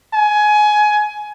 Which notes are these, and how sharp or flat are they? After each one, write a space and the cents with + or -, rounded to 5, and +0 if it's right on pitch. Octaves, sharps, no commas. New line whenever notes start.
G#5 +20